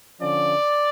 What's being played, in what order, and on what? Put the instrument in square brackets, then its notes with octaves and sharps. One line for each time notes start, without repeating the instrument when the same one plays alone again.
[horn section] D3 F3 C#4 D5